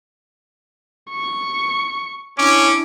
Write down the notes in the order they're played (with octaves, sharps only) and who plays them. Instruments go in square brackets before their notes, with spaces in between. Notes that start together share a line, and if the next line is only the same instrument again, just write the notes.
[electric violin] C#6
[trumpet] C#4 [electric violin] D4 E4 [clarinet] D6